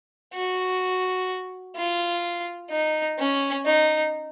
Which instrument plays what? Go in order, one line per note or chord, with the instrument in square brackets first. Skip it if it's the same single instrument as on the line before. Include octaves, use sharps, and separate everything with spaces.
[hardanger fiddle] F#4
F4
D#4
C#4
D#4